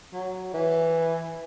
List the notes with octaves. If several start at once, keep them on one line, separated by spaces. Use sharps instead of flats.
F#3
E3